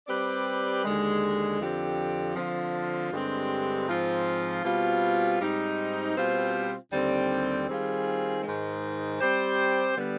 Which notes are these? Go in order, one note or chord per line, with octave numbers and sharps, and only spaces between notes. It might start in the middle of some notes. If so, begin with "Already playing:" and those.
G3 C4 G4 B4 D5
D#2 D3 G#3
F2 D3 F3 C4 G4
D3 F3 C4 F4
G2 D3 G#3 C4 G4
G#2 F3 C4 F4
B2 G3 C4 F4
G#2 G3 C4 D#4
B2 G3 C4 F4 C5
D#2 D3 G3 C4
D#3 G3 C4 F4 G#4
G#2 D#3 G#3
G3 C4 G4 C5
D3 G3 B3